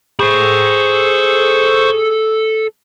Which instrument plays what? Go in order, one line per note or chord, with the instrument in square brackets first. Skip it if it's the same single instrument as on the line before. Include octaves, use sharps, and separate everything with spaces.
[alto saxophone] G#4 [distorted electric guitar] A4 B5 [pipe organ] C5 C#6